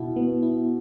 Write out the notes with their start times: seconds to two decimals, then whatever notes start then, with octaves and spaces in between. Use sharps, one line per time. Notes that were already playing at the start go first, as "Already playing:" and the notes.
Already playing: B2 E4
0.16 B3
0.43 E4